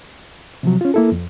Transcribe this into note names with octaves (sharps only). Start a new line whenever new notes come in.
C3 F3 F#3
C#4 F4
A#3 E4 A4
F2